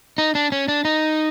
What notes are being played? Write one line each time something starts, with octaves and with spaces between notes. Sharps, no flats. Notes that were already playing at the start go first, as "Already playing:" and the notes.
D#4
D4
C#4
D4
D#4